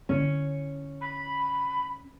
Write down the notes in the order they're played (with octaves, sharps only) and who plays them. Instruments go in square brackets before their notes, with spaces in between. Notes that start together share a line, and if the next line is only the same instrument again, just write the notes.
[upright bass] D3 E4 [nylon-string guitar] C#4
[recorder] B5